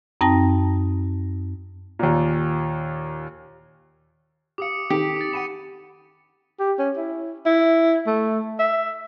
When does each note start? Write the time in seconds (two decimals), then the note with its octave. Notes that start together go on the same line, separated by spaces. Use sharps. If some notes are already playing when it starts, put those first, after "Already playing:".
0.21 F#2 C4 D#4 G5 A5 A#6
1.99 D#2 A#2
4.58 G4 F5 D6 D#6 C#7
4.90 D#3 C4 G4 A4
5.16 D6 A6
5.33 F#5 G5 B5 C#7 D#7 E7
6.59 G4
6.79 C#4
6.97 E4
7.46 E4
8.07 A3
8.59 E5